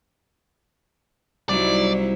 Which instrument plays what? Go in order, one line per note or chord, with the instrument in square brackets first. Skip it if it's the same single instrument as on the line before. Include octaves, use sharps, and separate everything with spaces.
[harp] C2 [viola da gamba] F#3 D#4 E4 [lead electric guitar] D5